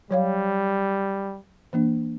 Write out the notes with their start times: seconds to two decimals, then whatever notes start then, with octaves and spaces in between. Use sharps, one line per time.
0.11 F#3 G3 C#5 F5
1.73 E3 A#3 D4